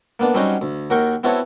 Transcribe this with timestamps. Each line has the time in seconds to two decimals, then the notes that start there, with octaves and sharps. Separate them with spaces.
0.20 A#3 B3 D4
0.35 F#3 G3 C4 C#4 D#4 F#4
0.62 D2
0.90 D#2 F#4 A#4 G5 C#6
1.24 B3 C4 E4 F#4 A4 C#5